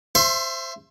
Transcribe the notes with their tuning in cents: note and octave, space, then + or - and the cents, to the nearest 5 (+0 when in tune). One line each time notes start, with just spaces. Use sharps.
C5 +0 E5 +25 C6 +30